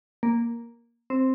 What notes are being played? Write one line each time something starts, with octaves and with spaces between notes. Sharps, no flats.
A#3
C4